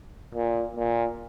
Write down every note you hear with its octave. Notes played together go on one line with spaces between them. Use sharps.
A#2
A#2